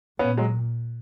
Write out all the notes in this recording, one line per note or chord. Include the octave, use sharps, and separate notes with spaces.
A#2 B3 C#4
F#3 G#3